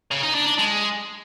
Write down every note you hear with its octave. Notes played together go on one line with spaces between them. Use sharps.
C#3
D#4
D4
D4
G#3